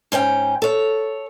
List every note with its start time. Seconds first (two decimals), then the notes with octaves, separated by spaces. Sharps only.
0.12 G#2 C#4 B4 G5
0.62 A4 C#5